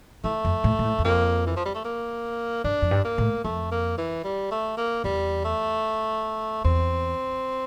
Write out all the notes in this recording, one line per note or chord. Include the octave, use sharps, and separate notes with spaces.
E3 A3
F2
A2
A#2
A2
E2
F2 A#3
E3
F3
G3
A3
A#3
G2 D4
F2
G2
A#3
A2
F2 A3
A#3
E3
G3
A3
A#3
E2 G3
A3
E2 C4